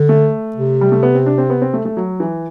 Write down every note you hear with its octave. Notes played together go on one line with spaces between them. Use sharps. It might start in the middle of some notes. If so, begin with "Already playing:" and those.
Already playing: D3
A3
C3
G3
A3
B3
C4
D4
C4
B3
C4
A3
A3
F#3
E3